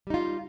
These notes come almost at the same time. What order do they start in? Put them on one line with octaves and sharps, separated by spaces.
G3 D#4 F4